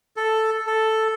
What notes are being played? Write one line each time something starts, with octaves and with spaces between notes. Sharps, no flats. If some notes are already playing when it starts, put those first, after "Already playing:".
A4
A4